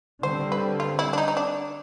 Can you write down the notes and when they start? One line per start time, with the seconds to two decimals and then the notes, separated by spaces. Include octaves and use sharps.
0.23 D3 G3 C4 C5
0.52 B4
0.80 F4
0.99 E4
1.13 D4
1.18 D#4
1.28 D#4
1.37 D4